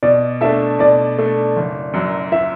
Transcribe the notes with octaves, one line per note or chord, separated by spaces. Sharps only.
B2 D5
A3 D4 A4 E5
B2 D5
A3 D4 A4
F#1
F#2 F#3
E5